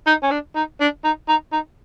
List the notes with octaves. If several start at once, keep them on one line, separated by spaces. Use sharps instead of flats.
D#4
C#4
D4
D#4
D4
D#4
D#4
D#4